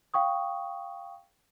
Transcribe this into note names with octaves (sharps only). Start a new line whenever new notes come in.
F5 G5 C#6 D#6